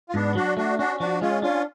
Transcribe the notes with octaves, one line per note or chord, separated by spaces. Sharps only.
F4
G#2 B3 D4
F#3 D4 F#4
A3 D4 F#4
C#4 D4 F#4
F3 D4 F#4
G#3 C#4 F4
C#4 D4 F4